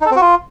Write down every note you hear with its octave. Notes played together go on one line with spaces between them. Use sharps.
D#4
A4
C4
F#4
F4